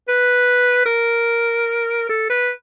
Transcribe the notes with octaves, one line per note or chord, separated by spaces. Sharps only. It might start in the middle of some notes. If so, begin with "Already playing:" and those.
B4
A#4
A4
B4